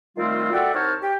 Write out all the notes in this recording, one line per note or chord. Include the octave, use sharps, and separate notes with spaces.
D#3 G3 A3 C4 F4
F#4 A4 D5 E5 F#5 G5
C2 D#4 C5 C#5 A5 F6
G4 G5